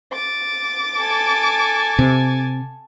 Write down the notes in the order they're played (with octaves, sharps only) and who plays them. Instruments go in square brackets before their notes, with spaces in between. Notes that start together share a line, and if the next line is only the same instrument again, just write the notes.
[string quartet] D6 A6
[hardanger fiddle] A4 G#5
[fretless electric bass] C3